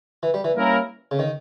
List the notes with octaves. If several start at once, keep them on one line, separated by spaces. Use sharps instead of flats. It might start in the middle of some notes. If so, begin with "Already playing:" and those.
E3
G3
E3
G3 A#3 C#4 E4 A#4
C#3
D#3